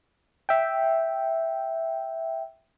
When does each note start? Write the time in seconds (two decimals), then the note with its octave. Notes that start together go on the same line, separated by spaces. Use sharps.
0.49 E5 G5